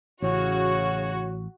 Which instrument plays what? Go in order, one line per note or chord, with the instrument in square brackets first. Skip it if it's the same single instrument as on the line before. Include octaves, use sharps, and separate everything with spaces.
[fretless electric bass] A1 [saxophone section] C#3 C#5 [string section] F#4